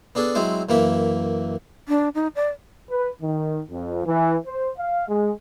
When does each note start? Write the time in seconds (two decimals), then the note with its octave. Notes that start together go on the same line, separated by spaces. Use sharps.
0.15 B3 D4 G#4 A4
0.35 F#3 G#3 C4 E4 C5
0.69 F#2 E3 A#3 E4 E5
1.88 D4
2.15 D#4
2.36 D5
2.90 B4
3.22 D#3
3.70 F2
4.05 E3
4.45 C5
4.77 F5
5.08 G#3